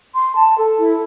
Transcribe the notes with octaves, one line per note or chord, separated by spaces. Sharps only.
C6
A5
A4
E4